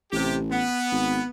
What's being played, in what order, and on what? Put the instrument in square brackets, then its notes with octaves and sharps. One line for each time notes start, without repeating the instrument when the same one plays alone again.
[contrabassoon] A1 [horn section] C3 G4
[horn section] B3
[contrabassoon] G#1